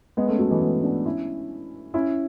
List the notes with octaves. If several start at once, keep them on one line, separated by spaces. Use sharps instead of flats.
G#3 B3
A3 C#4
F#3 A3
E3 G#3
G#3 B3
B3 D4
C#4 E4
C#4 E4